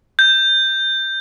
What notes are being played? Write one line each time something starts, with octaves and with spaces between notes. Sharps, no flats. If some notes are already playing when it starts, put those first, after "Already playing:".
G6